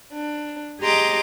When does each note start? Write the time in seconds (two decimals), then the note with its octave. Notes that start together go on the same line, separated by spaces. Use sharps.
0.13 D4
0.80 G4 G#4 D#5 A#5 C6 D6